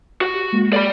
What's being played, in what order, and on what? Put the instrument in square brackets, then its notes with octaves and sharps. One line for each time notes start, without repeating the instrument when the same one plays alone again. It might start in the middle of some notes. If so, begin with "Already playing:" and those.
[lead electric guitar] F#4
[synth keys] G4
G#3 A#3
[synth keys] A4 [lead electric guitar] D5 B5